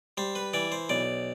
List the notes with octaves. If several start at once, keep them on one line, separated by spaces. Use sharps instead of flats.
G3 C5
B4
E3 D5
C5
B1 D5